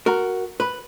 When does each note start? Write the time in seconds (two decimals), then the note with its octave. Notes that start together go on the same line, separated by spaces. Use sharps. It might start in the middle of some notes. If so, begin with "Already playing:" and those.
0.06 F#4 A#4
0.60 B4